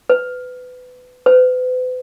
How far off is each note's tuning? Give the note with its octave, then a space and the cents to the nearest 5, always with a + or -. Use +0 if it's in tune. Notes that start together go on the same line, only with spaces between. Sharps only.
B4 +25
B4 +40